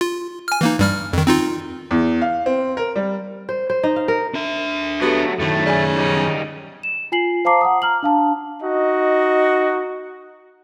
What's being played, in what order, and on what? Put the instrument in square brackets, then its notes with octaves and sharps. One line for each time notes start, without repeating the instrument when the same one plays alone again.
[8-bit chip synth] F4
G#5 F6
E3 A#3 D#4
G2 G3 F6
F2 D#3
C4 D#4 F4
[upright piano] E2
F5
C4
A#4
G3
[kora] C5
C5
D#4
F5
A#4
[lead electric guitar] D4 E5
[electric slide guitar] F#3 A3 [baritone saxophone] B3 [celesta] F#4 G4 A4
[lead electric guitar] F#2 D#3 [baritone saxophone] A2 [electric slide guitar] A3
[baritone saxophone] C#3 [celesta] D5 G#5
[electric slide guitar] G3 D#4
[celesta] E7
F4 G#5 C7 F#7
C5 F5 A5 A#5 D6 C7
F#5 A#5 D#6
A#5 F6 F#7
D4 F5 A5
[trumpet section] D#4 F#4 D#5